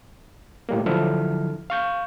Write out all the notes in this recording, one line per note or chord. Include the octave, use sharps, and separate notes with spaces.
A2 G3 A#3
D3 F3 F#3 E4 A4 F6
F5 C#6 G6